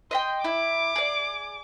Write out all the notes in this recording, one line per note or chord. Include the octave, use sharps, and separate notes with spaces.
D#5 E5 G5 C6
E4 D6
G#4 D5